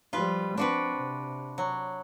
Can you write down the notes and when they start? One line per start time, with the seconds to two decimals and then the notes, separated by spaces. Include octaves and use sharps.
0.13 F3 G3 F4 B4
0.58 F3 C4 D4 F#4 B4
0.97 C3
1.58 F#3